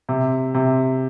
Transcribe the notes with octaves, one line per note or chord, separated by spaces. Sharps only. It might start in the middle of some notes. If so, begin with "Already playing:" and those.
C3
C3